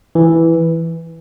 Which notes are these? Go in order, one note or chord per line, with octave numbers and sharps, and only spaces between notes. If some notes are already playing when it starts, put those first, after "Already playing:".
E3